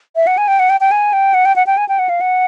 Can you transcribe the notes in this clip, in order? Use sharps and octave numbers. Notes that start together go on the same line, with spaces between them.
E5
F#5
G#5
G5
F#5
G5
G5
G#5
G5
F#5
G5
F#5
G5
G#5
G5
F#5
F5
F#5